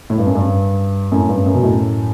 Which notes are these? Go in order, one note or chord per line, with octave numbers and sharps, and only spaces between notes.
A2
G2
F#2
G2
F#2 A2
G2
F#2
B2
F#2 A2